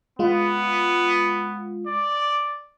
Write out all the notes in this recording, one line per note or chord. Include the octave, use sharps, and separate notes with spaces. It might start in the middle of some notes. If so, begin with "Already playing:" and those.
G#3 B3 F4
D5